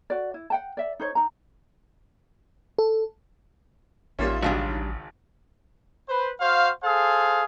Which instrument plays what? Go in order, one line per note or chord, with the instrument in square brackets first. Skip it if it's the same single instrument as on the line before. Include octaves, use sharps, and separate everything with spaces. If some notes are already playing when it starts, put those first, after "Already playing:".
[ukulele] F#4 D5
E4
F#5 G5 A5
D5 E5
D#4 C5 C#5
D#4 A#5
[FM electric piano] A4
[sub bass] A1 [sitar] D#2 F4 E5 [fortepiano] G3 A#3 C#4
[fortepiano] G#1 C#2 C#3 [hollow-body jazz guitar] G3 D4 F#4
[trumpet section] B4 C5
F#4 C5 F5
G#4 A4 C5 F5